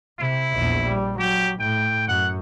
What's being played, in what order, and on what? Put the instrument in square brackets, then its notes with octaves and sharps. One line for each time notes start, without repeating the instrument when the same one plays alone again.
[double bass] C3 [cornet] E4
[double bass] A#1 E2
G3
[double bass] F#3 [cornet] G4
[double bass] A2 [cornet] G5
[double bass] F#2 [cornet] F#5